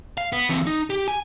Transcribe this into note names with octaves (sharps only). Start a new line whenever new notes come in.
F5
B3
E3 C4
D#4
G4
G#5